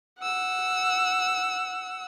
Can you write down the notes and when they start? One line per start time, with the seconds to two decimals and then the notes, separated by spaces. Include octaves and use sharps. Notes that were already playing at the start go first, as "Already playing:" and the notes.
0.19 F#5 E6